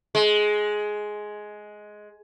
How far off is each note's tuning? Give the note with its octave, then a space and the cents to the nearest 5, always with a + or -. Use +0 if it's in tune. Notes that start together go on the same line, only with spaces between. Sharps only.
G#3 +10